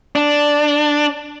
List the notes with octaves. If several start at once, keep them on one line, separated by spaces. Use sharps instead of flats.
D4